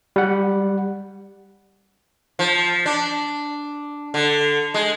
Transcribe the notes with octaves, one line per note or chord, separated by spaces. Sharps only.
G3 F#5
F3
D4
D3
G#3